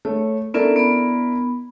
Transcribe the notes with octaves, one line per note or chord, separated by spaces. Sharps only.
A3 C#5
B3 C#4 D4 E4 A4 A#4
B3 B5